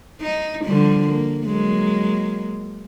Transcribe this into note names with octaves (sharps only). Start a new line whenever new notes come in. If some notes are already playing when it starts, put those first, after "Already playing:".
D#4
D3 F3 G3
A#3
F#3 G#3 A#3